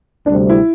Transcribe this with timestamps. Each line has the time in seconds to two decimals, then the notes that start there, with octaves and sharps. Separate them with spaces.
0.26 D2 C3 G3 C4 D4
0.50 E4